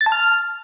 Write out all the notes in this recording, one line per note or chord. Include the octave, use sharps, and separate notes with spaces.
A6
A5
F6